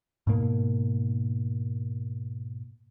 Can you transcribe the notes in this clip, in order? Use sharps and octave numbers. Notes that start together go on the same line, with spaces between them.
G#2 B2 A#3